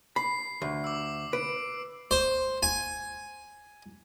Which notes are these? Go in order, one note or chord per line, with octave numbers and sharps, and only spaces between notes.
B5 C7
D2
D6 E6
B4 D7
C5
G#5